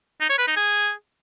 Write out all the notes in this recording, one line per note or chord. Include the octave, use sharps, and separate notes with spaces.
D#4
C#5
B4
D#4
G#4